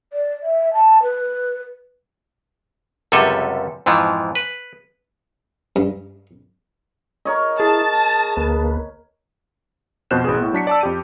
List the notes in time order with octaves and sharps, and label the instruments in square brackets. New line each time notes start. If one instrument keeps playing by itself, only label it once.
[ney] D5
E5
A5
B4
[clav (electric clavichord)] C#2 F#2 C3 G3 A4 G#5
F2 G#2 E3 F3
B4
[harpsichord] G2
[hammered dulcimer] A#4 C#5 D#5
[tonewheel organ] E4 [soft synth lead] G#4 [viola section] A5
[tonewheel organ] A#6
D2 A#3 B4
[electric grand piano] F2 B2 C5 F#6 G6 E7
A1 B2 B3 G#4
A2 B3
F#3 D4 B6 C#7
D5 A5 E6
F2 G4 D#7